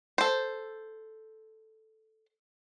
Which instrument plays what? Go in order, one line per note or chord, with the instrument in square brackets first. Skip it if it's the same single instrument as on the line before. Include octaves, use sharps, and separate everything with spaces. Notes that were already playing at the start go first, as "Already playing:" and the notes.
[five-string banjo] A4 C5